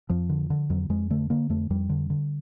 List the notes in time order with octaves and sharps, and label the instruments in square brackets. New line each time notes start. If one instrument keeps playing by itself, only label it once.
[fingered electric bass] F2 F3
D3
D3
F2 F#3
F2 G#3
D3 A3
D3 A#3
F2 A3
F2 G3
D3
D3